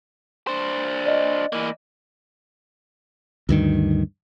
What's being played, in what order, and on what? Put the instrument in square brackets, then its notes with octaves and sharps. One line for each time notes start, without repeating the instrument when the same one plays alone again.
[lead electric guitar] D4 C5
[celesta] D5 D#5
[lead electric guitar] E3 A#3
[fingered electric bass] D2 G2 D#3